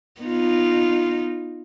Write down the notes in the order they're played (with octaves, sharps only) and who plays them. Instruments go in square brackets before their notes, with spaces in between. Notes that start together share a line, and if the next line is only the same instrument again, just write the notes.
[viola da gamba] B3 D#4 F4